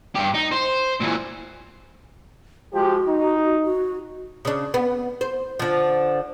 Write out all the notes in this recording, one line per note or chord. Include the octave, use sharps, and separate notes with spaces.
G2 G4
D#4
C5
A#2 E3
F3 G#3 F#4 G4
D#4
F#4
C#3 D4
B3
C5
D3 F3